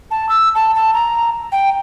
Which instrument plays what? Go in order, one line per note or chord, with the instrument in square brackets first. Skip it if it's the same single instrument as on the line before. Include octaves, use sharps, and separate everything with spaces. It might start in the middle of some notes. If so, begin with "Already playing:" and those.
[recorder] A5
E6
A5
A5
A#5
G5